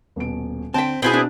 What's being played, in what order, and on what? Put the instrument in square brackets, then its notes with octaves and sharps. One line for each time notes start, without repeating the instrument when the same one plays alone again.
[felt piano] D#1 B2 D7
[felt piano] D3 C5 B6 [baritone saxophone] C4 [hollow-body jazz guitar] G5 A5
[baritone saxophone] B2 [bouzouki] C4 E4 G#4 [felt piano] B4 F#6 A6
[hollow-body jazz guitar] D4